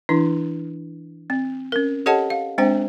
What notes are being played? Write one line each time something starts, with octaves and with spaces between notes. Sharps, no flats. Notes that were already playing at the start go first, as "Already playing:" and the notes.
E3 D4 E4
C4
C#4 A#4
G4 A4 C#5 D#5 F#5 A5
F5
G#3 C4 D4 C5 G5